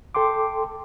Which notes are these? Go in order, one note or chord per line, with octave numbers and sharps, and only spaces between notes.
A4 G5 C6 D6